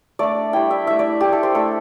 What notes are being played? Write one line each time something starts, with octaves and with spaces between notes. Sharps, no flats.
A3 D4 D5
G3 E4 G5
E5
A3 D4 E5
D5
A3 E4 G4
A4
C5
A3 D4 A4